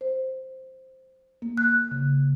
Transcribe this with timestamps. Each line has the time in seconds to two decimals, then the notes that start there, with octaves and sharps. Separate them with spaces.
0.01 C5
1.42 A#3
1.57 F#6
1.91 C#3